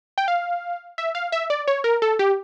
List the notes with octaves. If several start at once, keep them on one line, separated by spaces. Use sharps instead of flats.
G5
F5
E5
F5
E5
D5
C#5
A#4
A4
G4